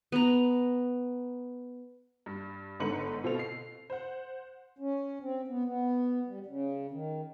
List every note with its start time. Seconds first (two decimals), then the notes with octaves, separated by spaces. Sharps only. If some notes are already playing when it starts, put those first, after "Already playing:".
0.12 B3 A#5
2.26 G2
2.80 G1 G#2 D3 B4 C#7 F#7
3.24 B2 C4 F4 A4 F7
3.39 C7
3.90 C5 F#5
4.79 C#4
5.20 C4
5.48 B3
5.65 B3
6.27 G3
6.46 C#3
6.91 D#3